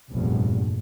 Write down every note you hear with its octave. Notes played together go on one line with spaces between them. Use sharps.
F1 A#1 E2 G2